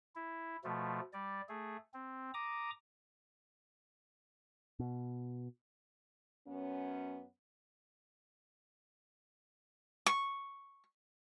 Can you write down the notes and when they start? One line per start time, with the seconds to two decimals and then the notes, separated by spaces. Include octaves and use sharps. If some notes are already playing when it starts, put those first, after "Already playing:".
0.16 E4
0.64 B2 F3 A3
1.13 G3 D5
1.49 A3 G#4
1.94 C4
2.34 A#5 D6 D#6
4.79 B2
6.46 F#2 B3 C#4
10.06 C#6